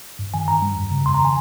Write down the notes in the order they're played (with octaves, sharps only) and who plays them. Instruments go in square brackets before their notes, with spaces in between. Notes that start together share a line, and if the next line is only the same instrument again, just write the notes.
[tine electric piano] G2
D#3 G#5
G2 A#5
G3
F2
C#3
F2 C6
A#5
D#3 G#5